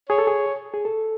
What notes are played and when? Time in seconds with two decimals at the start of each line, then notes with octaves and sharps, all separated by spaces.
0.09 G#4 C#5
0.18 A4
0.27 G#4
0.74 G#4
0.85 A4